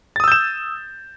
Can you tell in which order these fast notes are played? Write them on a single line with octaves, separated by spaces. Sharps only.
A6 D#6 E6 G6 E7